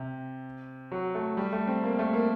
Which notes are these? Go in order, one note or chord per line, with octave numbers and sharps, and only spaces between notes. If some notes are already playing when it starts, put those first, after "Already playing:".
Already playing: C3
F#3
A3
G3
A3
C4
A#3
A3
A#3